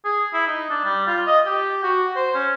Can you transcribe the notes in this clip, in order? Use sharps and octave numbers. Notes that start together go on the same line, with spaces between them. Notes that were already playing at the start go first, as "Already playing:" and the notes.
G#4
E4
D#4
D4
G3
F4
D#5
G4
F#4
C5
C#4